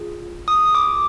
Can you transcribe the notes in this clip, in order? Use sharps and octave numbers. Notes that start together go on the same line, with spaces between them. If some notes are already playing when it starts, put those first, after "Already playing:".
Already playing: F4 G#4
D#6
D6